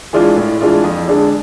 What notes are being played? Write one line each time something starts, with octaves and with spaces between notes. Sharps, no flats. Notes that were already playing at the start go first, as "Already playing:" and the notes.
E3 G#3 D4 F4
A2
E3 G#3 D4 F4
F2
D3 G#3 D4 G#4